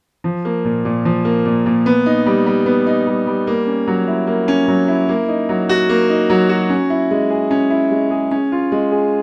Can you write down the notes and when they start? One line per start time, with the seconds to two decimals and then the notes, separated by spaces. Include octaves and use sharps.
0.24 F3
0.45 A#3
0.65 A#2
0.85 A#2
1.05 F3
1.25 A#3
1.46 A#2
1.66 A#2
1.86 B3
2.06 D#4
2.26 G3
2.46 G3
2.66 B3
2.87 D#4
3.07 G3
3.27 G3
3.47 A#3
3.67 C#4
3.87 F#3
4.08 E4
4.27 A#3
4.48 C#4
4.68 F#3
4.88 E4
5.09 A#3
5.28 D#4
5.49 F#3
5.69 F#4
5.89 A#3
6.10 D#4
6.30 F#3
6.49 F#4
6.70 C#4
6.90 E4
7.11 G#3
7.30 G#4
7.51 C#4
7.70 E4
7.91 G#3
8.11 G#4
8.31 C#4
8.52 F4
8.72 G#3
8.92 G#4